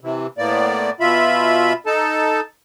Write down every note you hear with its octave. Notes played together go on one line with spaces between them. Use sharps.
C3 E3
A2 A#3 B3 D5
B2 F4 E5 B5
D#4 A4 A5